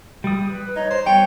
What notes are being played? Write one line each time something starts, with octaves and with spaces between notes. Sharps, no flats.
G3 D#6
B4
D#4 C#5
C5
G3 B3 C#5 G5